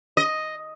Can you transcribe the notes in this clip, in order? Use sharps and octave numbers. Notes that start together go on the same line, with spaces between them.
D#5